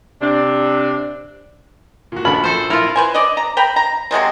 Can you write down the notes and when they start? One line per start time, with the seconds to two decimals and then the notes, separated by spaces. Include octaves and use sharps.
0.21 C3 D4
2.12 A#2 F#4
2.25 A#1 C#4 D4 B5 F#7
2.44 A4 C5
2.70 E4 F4 A#4
2.96 B4 C5 G#5
3.14 D5 D#5
3.37 A#5
3.57 G5 A#5 B5
3.76 A#5
4.11 C3 F#3 G#3 C4